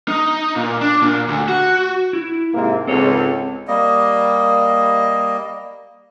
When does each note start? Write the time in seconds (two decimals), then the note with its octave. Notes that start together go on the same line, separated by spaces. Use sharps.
0.08 D#4
0.56 A#2
0.81 D4
1.02 A#2
1.28 D2
1.48 F#4
2.13 E4
2.54 G#2 C3 A#3
2.87 C#2 G#2 C4 A4 C#5
3.68 G3 A#3 D#5